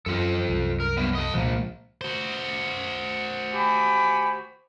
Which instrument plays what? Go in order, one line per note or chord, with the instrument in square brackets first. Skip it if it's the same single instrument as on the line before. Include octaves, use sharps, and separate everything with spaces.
[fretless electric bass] F#2 [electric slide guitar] C4 F4 A4
[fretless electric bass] C2 F#2
[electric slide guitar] A#4
G3 A#3 B3
A4 D#5
[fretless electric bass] C2 A#2 G#3 [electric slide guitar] F3 A#3
[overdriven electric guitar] F#4 C5
[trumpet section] G4 G#5 B5